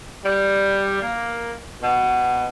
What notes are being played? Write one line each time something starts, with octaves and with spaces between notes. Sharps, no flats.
G3
A#3
B2